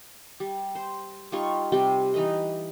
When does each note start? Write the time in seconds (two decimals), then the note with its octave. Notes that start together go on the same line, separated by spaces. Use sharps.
0.40 G3
0.75 C5
1.32 G3 D#4 F4 C#6
1.72 C3 G3 G4 G5
2.14 E3 D#4 B4 D#5